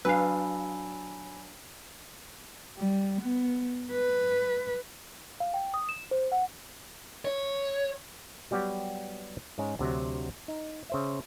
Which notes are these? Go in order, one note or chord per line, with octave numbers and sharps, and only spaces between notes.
F#3 D4 B4 F5 G#5 B5 E6
G3
B3
B4
F5
G5
D#6
E7
C5
F#5
C#5
F#3 G3 B3 F#4 G4
G#2 G#3 C#4
D2 C3 F#3
D#4
C#3 C5 E5